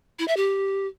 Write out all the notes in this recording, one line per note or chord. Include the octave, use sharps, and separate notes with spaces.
E4
E5
G4